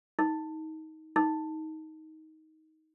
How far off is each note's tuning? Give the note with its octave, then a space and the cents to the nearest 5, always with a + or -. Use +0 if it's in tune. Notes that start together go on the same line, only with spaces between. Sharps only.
D#4 +20
D#4 +15